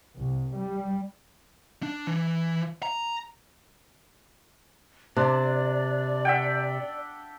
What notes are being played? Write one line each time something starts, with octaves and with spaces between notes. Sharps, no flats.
C2
G3
D4
E3
A#5
C3 D4 D5
E5 F#5 G5